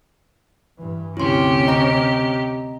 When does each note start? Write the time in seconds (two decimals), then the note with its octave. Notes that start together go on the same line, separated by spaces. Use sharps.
0.79 G2 E3
1.17 D2 C3 C#4 E4 G4 C6
1.67 D#5 A#5 A#6